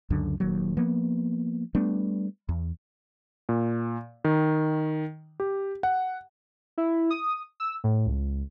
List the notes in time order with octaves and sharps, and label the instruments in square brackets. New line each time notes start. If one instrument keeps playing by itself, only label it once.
[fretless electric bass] C#2 F#2 D3
D#1 D#2 F#3
F3 A#3 B3
G3 A3 B3 D4
E2
[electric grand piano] A#2
D#3
G4
F#5
[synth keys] E4
D#6
E6
A2
C#2